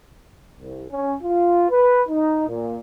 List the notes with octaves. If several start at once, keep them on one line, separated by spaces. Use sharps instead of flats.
C2
C#4
F4
B4
D#4
A#2